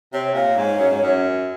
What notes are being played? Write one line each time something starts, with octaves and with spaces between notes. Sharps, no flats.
C3 C#5
A#2 C#5
G#2
F#2
G#2
F#2